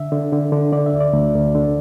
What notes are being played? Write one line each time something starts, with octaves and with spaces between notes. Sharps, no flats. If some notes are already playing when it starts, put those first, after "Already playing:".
Already playing: D3 E5
D3
D3
D3
D3 D5
E5
D2
D5
D2
D2
D3